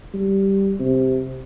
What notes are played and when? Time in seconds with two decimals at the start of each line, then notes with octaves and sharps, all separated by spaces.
0.14 G3
0.80 C3